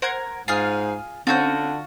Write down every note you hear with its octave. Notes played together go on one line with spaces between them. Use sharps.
A#4 C5 F#5 G#6
G#2 F4 G#4 F6 C7
D3 C4 C#4 F4 F#4 G6